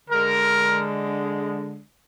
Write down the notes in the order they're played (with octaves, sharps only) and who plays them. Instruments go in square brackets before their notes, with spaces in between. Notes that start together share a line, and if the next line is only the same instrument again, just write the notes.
[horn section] D3 G#3 A#4